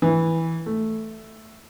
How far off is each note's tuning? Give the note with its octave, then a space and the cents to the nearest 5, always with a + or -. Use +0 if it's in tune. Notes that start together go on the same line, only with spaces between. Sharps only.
E3 -10
A3 +0